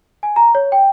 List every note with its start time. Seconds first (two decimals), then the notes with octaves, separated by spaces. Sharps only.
0.23 G#5
0.36 A#5
0.55 C#5
0.72 G5